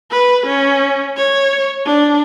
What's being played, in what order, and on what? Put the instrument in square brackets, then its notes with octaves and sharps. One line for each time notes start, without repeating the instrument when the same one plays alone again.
[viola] B4
C#4
C#5
D4